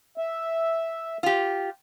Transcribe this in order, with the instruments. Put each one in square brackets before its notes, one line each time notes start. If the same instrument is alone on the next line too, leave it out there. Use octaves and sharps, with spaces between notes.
[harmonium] E5
[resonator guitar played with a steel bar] F4 G4